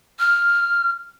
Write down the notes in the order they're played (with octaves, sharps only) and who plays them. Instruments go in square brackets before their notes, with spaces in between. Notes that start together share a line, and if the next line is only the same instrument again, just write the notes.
[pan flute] F6